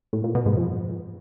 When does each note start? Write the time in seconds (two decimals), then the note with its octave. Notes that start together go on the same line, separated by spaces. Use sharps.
0.13 A2
0.24 A#2
0.35 B2
0.46 G#2
0.57 F2